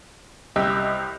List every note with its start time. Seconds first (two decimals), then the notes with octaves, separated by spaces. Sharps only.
0.56 C2 G4 D#5 E6